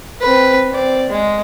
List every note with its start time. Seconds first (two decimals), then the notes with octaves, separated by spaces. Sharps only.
0.21 C4 B4
0.70 C4 D5
1.10 G#3